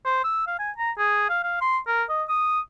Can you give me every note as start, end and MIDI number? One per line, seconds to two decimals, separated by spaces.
0.06 0.21 72
0.24 0.47 88
0.47 0.59 77
0.59 0.71 80
0.78 0.91 82
0.98 1.26 68
1.29 1.43 77
1.44 1.61 77
1.61 1.78 84
1.87 2.04 70
2.09 2.24 75
2.29 2.60 87